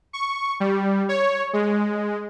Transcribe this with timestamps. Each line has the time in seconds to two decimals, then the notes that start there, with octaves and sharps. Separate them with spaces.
0.13 C#6
0.60 G3
1.09 C#5
1.53 G#3